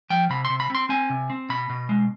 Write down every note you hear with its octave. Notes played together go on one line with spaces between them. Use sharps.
F3 G5
C3 B5
C6
C3
B5
C4 C6
C4 G#5
C3
C4
B2 B5
B2
G#3